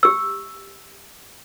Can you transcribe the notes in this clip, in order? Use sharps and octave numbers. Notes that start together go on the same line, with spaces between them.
G4 E6